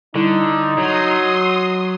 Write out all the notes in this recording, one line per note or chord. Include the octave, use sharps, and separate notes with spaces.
D3 G3 D#4 E4
F#3 C6 D#6